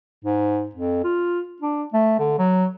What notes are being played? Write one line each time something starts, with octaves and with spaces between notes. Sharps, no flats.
G#2
F2
F4
D4
A3
D3
F#3